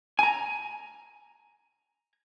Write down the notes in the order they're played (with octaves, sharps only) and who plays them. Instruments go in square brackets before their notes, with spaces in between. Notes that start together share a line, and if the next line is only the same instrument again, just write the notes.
[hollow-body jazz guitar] G#5 A#5